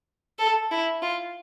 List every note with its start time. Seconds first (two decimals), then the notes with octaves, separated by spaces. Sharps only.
0.39 A4
0.71 E4
1.02 F4